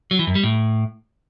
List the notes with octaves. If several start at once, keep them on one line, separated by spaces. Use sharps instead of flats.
F#3
E3
F#2
G3
A2